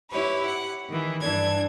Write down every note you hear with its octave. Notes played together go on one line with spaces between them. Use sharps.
E4 G4 B4 C#5
F#5
D#3 E3
G2 E3 D4 G#6